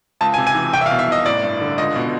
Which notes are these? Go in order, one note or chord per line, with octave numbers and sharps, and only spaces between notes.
C#2 A5
G#5
C3
G#5
E3
C2 G5
E5
F5
B2
E5
C2 D#5
A1 D5
G2
D3
C#2 D#5
B2